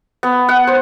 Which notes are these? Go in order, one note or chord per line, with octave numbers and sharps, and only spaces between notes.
B3
F#5
C5